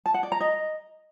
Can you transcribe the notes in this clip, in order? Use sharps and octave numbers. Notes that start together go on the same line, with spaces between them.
A5
F#5
D5
A#5
D#5